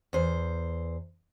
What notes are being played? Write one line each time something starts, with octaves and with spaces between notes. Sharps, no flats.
E2 C5